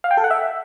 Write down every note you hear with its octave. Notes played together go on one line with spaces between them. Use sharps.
F5
G5
A4
F#5
E5